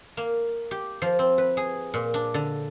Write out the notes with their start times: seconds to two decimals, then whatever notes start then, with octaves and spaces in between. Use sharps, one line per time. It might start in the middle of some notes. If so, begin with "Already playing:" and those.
0.17 A#3
0.71 G4
1.02 F3
1.19 C4
1.38 B4
1.57 G#4
1.94 A#2
2.14 D4
2.34 D3